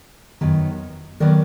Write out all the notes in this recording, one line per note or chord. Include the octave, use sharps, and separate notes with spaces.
F#2 D#3 F#3 B3
D#3 F#3 B3 A#4 D5